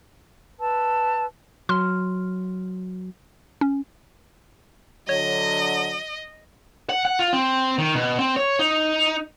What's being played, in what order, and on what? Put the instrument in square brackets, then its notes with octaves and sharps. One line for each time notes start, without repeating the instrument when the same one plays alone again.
[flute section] B4 A5 E6
[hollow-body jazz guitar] F#3 [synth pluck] C6 F6
[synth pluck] C#4
[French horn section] D3 F#3 [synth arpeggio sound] C#5 [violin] D#5
[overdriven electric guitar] F#5
F#5
F4
C4
D#3
B2
C4
C#5
D#4